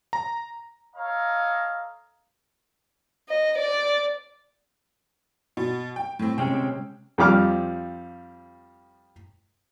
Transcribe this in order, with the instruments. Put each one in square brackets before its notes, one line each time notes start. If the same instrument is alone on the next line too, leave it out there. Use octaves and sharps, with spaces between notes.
[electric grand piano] A#5
[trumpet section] A4 C#5 D#5 F5 A#5
[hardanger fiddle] D#5
D5
[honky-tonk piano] B2
G5
A2 C4
[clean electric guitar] C3 G#3 C#4 [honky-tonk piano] G5
[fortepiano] F2 F3 G3 D6 F6